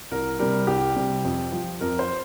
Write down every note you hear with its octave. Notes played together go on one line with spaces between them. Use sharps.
C2 A#4
C3 G3 A#4
C2 G4
C3 G3
F2
F3
F2 A#4
C5